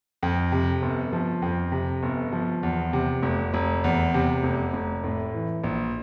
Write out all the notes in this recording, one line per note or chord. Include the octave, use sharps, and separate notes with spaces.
F2
C3
G1
F3
F2
C3
G1
F3
E2
C3
F1
F1
E2
C3
F1
F1
A2
E3
A#1